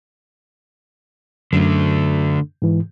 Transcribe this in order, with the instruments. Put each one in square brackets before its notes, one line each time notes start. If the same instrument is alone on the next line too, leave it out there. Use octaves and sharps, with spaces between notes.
[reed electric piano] F#2 [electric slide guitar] D3 A3
[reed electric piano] G#2 E3